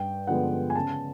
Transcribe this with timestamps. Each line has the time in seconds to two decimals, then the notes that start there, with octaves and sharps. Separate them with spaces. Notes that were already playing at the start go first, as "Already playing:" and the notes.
Already playing: G2 G5
0.27 D3 F3 G#3 B3 F#5
0.70 G#5
0.76 C#3 A5